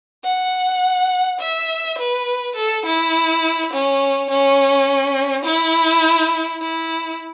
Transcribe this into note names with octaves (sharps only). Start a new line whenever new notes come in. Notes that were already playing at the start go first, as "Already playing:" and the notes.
F#5
E5
B4
A4
E4
C#4
C#4
E4
E4